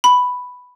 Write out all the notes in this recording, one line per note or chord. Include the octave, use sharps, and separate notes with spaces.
B5